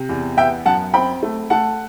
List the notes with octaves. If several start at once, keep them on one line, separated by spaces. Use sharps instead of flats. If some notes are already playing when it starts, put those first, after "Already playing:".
Already playing: C3
E2
B3 E5 G5
F#2 F#5 A5
C4 G5 B5
A3
A3 F#5 A5